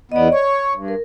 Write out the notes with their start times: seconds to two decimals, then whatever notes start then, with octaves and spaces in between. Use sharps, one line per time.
0.12 E2 B3 D5 D#5
0.32 C#5 C#6
0.74 G2
0.88 A#4